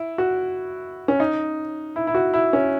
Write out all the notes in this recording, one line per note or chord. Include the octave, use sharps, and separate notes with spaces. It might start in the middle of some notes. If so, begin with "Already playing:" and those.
Already playing: E4
F#4
C#4
D#4
E4
E4
F#4
E4
C#4